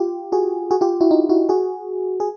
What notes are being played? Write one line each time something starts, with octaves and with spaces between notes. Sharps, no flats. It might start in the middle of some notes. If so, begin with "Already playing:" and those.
Already playing: F4 G4
F#4 G#4
F#4 G#4
F4 G4
E4 F#4
D#4 F4
E4 F#4
F#4 G#4
G#4